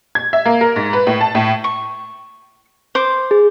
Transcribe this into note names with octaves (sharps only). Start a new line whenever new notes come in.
G#6
E5
A#3
A#4
G#2
B4
A2
A5
A2
C#6
C5 D6
G#4